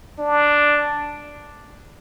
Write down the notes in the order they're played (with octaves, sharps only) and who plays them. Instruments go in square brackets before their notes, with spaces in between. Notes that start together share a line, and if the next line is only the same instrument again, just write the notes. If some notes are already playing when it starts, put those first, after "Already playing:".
[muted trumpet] D4